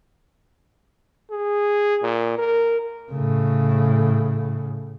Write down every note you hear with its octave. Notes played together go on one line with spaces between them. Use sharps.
G#4
A#2
A#4
A2 C#3